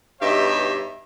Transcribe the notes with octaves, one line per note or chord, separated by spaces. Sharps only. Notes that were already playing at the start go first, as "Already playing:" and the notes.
G2 B2 D#4 G4 C#5 E5